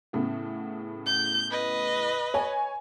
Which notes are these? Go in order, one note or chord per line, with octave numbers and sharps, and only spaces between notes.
A2 C#3 B3
G6
B4 D#5
C#5 G#5